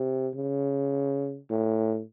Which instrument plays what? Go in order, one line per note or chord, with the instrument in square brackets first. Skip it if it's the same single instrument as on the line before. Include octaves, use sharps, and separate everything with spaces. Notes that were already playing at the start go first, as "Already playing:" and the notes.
Already playing: [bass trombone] C3
C#3
A2